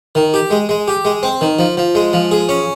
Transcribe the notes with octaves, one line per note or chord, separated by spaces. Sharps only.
D#3
G4
G#3
G#3
G4
G#3
C4
D#3
F3
F3
G#3
F3
G#4
C#4